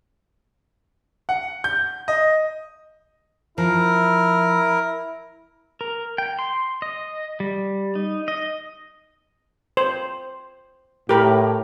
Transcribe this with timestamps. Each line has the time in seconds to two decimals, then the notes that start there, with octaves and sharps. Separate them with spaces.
1.29 F#5
1.64 G6
2.08 D#5
3.58 F3 E4 A#4
5.81 A#4
6.18 G5
6.39 C6
6.82 D#5
7.40 G3
7.95 D#4
8.28 D#5
9.77 C5
11.09 A2 G4 A#4 B5